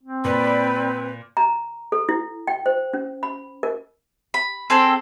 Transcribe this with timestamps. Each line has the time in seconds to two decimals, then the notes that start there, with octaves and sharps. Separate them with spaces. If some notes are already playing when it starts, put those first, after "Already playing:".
0.03 C4
0.24 A#2 B4 D5 B5
1.37 A#5
1.92 A4
2.09 E4
2.47 G5
2.66 C5
2.93 C#4
3.23 B5
3.63 A#4
4.34 B5
4.70 C4 G#4 A4 G5